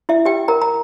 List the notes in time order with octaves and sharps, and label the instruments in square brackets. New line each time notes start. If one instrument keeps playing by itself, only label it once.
[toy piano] E4 E5
G4 G5
A#4 A#5
A#5